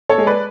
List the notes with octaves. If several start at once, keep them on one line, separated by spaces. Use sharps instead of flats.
A4 C#5
G#3
B4 D5